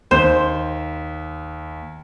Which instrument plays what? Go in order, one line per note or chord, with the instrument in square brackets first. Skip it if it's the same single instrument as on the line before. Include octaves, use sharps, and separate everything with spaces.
[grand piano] D#2 [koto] C5